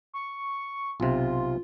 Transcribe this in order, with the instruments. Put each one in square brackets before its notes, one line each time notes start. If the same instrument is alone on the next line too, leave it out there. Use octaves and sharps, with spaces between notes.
[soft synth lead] C#6
[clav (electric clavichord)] B1 C3 [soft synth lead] F4